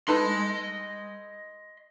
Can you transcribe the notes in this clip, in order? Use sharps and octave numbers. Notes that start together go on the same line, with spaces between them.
D#4 A4 B4 D#5 C6